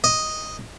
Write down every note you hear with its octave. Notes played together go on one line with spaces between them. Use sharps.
D#5